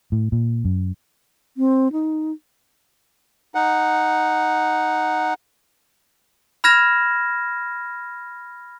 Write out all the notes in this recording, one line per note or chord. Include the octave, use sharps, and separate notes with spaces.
A2
A#2
F#2
C4
D#4
D#4 F#5
B5 F6 G#6 A#6 E7